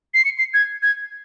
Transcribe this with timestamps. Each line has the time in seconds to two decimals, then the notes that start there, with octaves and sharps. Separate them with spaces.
0.14 C7
0.25 C#7
0.38 C7
0.54 G#6
0.83 G#6